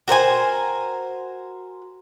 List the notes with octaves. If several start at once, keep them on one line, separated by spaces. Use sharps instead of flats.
F#4 A#4 C5 G#5